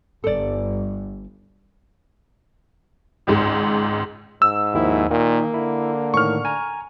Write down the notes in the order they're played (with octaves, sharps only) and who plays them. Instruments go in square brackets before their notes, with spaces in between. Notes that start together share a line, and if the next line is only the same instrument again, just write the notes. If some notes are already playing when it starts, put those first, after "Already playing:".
[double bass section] G1 G2 [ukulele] A4 D5
[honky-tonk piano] G#1 C#2 G#2
[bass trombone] G#2 [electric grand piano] E6
[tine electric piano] D#2 D#3 F3 [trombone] E4
[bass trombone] A#2 [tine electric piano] D#3 [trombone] A#3
[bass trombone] D3 [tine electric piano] E4
[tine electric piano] A2 D#3 [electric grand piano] C#6 F6
[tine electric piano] G#5 A#5